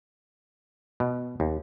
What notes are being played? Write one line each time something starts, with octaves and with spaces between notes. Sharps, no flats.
B2
D#2